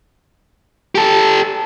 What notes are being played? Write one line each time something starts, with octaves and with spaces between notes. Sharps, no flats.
G4 A4